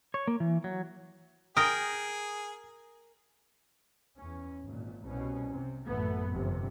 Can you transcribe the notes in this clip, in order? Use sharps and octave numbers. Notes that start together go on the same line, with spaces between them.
C#5
A#3
E3
F#3
G#4 A#4 G5 D#6
E2 C#4
G#1 A#2
C2 B2 C#4
C3
A1 F#2 A3 B3
G1 F2 C3